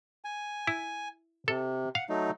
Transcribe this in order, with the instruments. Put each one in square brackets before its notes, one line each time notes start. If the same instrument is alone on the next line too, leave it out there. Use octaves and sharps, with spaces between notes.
[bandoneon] G#5
[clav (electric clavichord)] E4
[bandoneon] C3 [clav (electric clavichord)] A4
[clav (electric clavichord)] F5 [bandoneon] F#5
[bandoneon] F#3 A3 D#4